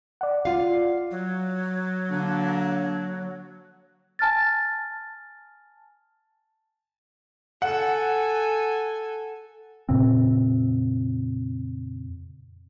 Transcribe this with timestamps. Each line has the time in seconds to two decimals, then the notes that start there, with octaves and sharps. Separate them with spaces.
0.21 D5 F#5
0.45 F4 F5
1.11 F#3
2.11 D3 A#3 D4
4.19 G#5 A5 F6 A6
7.62 A4 F#5 G#5
9.89 F2 A#2 C#3 C4